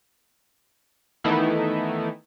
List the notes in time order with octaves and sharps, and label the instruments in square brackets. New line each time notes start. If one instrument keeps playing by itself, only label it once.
[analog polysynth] D#3 E3 A3 B3 D#4 E4